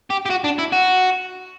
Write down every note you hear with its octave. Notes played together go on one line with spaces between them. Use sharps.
G4
G4
F#4
D4
E4
F#4